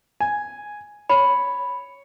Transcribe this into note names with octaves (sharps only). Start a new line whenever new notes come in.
G#5
C#5 B5